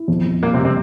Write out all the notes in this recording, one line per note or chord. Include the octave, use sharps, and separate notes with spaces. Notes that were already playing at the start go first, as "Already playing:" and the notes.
Already playing: E4
F2
F2
A#2 G3 A#3
C3 C4
G3
C3 C4